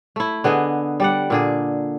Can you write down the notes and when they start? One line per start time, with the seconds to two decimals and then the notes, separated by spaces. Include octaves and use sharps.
0.16 A3 E4
0.44 D3 B3 G#4 D#5
1.00 G3 D5 F#5
1.30 A#2 D3 G#4